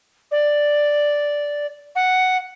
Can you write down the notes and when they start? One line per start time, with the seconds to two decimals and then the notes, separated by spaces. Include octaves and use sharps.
0.31 D5
1.95 F#5